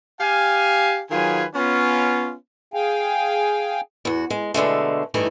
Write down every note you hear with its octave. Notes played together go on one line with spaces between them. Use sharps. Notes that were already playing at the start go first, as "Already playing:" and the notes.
G4 F5 G#5
D#3 F#3 F4 G#4 B4 G#5
B3 C#4 F4
G#4 F5 G5 G#5
E2 F#4
G#3
B2 D3 G#3 A3
G2 E3 A3 D#4